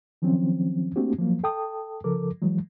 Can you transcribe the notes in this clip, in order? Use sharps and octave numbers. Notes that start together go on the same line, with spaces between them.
D#3 F3 F#3 C4 C#4
A3 A#3 C4 D4 F#4 G4
F3 F#3 A#3
A4 G5 A5 D#6
C#3 F3 A4 A#4 D6
E3 F#3 G#3